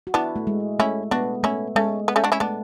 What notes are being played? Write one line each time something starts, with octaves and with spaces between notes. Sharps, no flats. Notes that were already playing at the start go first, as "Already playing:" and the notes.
F#4
B3 D4 E4
A3
G#3
A3 C#4 E4
B3 D4 F#4
A3 C#4 E4
G#3 A3 C#4
B3
A3 C#4
D4 F#4
C#4 E4
A3 B3 D4